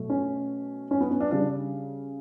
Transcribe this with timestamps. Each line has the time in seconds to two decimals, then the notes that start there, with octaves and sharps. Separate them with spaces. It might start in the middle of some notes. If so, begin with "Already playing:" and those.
Already playing: B2 F#3 A3
0.10 C#4
0.91 C#4
1.00 B3
1.11 C#4
1.21 D4
1.31 C#3 G3 D4